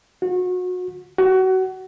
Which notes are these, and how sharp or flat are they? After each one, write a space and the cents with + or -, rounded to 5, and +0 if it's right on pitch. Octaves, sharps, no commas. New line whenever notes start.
F#4 -30
F#4 +25